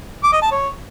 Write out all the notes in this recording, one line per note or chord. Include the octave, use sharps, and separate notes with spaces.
D6
D#5
A5
C#5